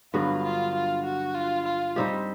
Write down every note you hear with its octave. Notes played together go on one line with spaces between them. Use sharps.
G2 D3 F#3 B3 F4
F4
F4
F#4
F4
F4
G3 C4 D#4 G4